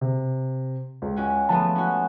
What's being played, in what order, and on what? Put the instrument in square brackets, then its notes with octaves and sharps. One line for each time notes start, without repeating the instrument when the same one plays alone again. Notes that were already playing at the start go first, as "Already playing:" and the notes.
[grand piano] C3
C#2
[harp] G#3 C#4 F#4
[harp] F3 A3 B3 [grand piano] A5
[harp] C#4 F#4